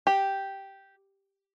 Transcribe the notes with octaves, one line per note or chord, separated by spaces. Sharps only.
G4